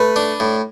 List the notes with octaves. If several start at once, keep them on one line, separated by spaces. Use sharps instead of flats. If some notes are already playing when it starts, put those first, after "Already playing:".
Already playing: A3 B4
D4
A2